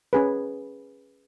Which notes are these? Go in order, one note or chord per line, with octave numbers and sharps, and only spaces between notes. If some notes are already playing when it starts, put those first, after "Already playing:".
C#4 G#4 B4